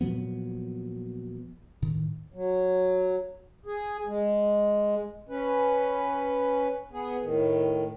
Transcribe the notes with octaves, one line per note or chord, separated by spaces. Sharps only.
A#2 F3 F#3 B3
A2 D#3
F#3
G#4
G#3
C#4 B4
B3 G#4
A2 D#3